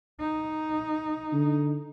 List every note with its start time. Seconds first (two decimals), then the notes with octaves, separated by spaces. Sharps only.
0.20 D#4
1.33 D3